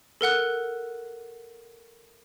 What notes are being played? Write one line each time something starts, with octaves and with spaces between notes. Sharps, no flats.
A4 A#4 F#5 F#6